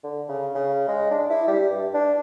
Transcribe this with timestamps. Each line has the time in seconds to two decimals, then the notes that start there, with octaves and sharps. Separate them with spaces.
0.03 D3
0.29 C#3
0.55 C#3
0.88 G#3
1.11 D4
1.30 E4
1.47 G3
1.70 G2
1.94 D4